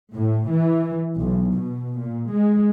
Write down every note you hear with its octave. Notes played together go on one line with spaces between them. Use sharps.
A2
E3
B1
B2
A#2
G#3